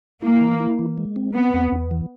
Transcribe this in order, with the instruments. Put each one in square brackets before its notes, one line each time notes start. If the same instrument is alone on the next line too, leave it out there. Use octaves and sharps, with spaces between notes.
[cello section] A#3 [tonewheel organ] E4
[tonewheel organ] E3
E4
E3
G#3
C4
[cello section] B3 [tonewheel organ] C4
[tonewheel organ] E2
E2
E3